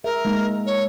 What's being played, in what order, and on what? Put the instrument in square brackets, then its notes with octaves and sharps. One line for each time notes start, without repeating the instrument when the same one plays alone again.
[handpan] G#4 E5 [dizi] A#4
[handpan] G#3 A#3 D#4
[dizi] C#5